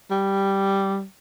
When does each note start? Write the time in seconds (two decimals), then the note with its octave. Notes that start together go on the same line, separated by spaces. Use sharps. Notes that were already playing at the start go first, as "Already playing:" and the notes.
0.11 G3